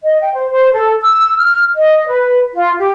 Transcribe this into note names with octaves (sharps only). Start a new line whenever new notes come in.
D#5
G5
C5
C5
A4
E6
F6
D#5
B4
F4
G4